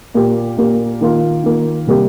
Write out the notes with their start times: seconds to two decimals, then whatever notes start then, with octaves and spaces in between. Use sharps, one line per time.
0.14 A#2 A#3 G4
0.57 A#2 A#3 G4
1.01 D#3 A#3 F4
1.43 D#3 A#3 F4
1.87 C3 G3 A#3 G4